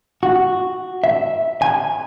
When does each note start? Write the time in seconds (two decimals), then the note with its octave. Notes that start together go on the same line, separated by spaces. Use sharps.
0.23 F#4
1.04 E5
1.62 G#5